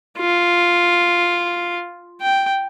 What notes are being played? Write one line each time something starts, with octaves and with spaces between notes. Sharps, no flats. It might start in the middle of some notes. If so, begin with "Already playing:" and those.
F4
G5